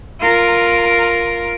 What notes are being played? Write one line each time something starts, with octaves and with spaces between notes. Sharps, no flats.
F4 A#4